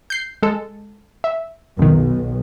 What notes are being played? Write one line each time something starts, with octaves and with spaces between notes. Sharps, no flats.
G6 C7
G#3 A4
E5
B1 F2 D#3